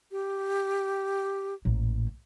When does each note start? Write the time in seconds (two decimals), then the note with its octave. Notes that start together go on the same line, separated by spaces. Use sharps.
0.12 G4
1.65 A1 A#2